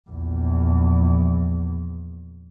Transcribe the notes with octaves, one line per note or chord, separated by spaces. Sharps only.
A#1 E2